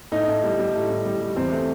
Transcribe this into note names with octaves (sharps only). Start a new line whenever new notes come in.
A2 D#4
A2
G3
G3
A2
A2
G3
G3
E2 C4
A3